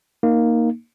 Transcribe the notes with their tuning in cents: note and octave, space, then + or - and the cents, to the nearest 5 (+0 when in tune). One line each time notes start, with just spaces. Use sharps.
A#3 +0 D#4 +0